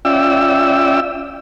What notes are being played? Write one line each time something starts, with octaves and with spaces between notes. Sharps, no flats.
C#4 F4 D5 E5 G5 E6